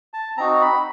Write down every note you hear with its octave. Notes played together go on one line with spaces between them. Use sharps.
A5
C4 D#4 F#4 A#5
B5